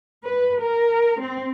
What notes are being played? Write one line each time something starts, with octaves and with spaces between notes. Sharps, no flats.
B4
A#4
C4